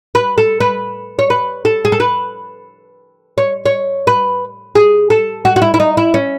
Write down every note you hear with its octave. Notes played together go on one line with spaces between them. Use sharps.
B4
A4
B4
C#5
B4
A4
G#4
A4
B4
C#5
C#5
B4
G#4
A4
F#4
F#4
E4
E4
D#4
E4
C#4